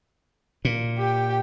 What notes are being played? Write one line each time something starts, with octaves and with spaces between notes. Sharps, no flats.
A#2
G4 G5